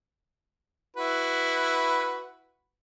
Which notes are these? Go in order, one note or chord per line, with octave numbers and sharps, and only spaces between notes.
E4 F#4 B4